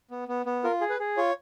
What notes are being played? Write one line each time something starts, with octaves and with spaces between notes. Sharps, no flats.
B3
B3
B3
F4 A#4
G#4
B4
G#4
F4 C#5